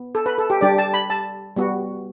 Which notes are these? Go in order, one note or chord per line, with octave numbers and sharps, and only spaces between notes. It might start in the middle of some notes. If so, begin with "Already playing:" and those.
Already playing: B3
A4
B4
A4
G4
G3 D4 G4 D5
A5
B5
A5
G3 B3 F#4